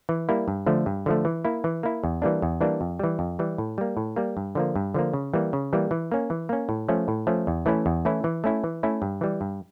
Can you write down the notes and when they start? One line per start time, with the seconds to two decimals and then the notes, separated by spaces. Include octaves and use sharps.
0.09 E3
0.29 G3 A#3 E4
0.48 G2
0.66 D3 F3 A3
0.86 G2
1.06 D3 F3 A3
1.25 E3
1.45 A#3 E4
1.64 E3
1.83 A#3 E4
2.04 E2
2.22 E3 G3 A#3 D4
2.42 E2
2.61 E3 G3 A#3 D4
2.81 F2
2.99 E3 G3
3.19 F2
3.39 E3 G3
3.58 A2
3.78 G3 A#3
3.97 A2
4.16 G3 A#3
4.37 G2
4.55 D3 F3 A#3
4.76 G2
4.94 D3 F3 A#3
5.13 C#3
5.33 E3 G3 A#3
5.53 C#3
5.73 E3 G3 A#3
5.91 E3
6.12 A#3 C#4
6.30 E3
6.49 A#3 C#4
6.69 A2
6.88 F3 A3 C#4
7.08 A2
7.27 F3 A3 C#4
7.47 E2
7.66 E3 A3 C#4 E4
7.86 E2
8.05 E3 A3 C#4 E4
8.24 E3
8.44 A3 C#4 E4
8.64 E3
8.83 A3 C#4 E4
9.02 G2
9.21 E3 G3
9.41 G2